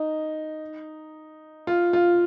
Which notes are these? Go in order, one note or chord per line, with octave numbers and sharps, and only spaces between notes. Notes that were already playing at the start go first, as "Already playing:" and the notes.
Already playing: D#4
F4
F4